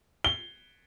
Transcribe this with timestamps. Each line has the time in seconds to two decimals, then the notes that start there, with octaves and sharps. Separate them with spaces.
0.25 G7